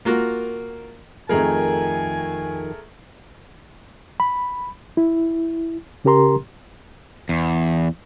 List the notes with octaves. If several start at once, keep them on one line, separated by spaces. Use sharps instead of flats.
A#3 F4 F#4 A#4
F2 D#3 A3 G#4 A#4 G#5
B5
E4
C#3 C#4 G4 A#4 A#5 C6
E2